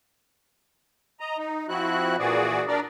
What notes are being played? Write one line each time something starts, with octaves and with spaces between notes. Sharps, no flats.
D#5 A#5
D#4
F3 C4 E4 F#4 F#6
A#2 E3 F#4 G#4 D5
D4 A#4 D5